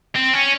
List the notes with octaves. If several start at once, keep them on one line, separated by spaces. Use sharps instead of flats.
C4
C#4